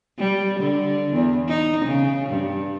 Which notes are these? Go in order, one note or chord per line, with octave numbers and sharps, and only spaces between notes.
G3
D3
E2
D#4
C#3
G2